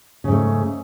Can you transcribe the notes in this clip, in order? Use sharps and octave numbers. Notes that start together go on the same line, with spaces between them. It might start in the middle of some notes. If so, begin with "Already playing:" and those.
G#2 C#3 A3